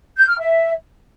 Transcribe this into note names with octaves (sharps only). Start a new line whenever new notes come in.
G6
F6
E5